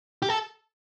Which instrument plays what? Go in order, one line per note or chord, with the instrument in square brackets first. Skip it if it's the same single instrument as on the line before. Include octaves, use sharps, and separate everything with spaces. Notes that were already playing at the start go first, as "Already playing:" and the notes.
[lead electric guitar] G4
A4